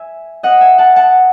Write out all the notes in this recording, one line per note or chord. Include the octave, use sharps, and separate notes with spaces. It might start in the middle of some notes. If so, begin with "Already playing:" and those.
Already playing: E5 G#5
D#5 F#5
E5 G#5
F#5 A5
F#5 A5